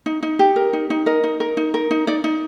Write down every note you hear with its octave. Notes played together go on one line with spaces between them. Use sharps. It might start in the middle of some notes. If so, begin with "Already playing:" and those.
D#4
D#4
G4
A#4
D#4
D#4
A#4 D#5
D#4
A#4
D#4
A#4
D#4
D#4 D5
D#4